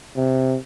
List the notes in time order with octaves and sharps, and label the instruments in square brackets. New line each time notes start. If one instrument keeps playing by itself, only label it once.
[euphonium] C3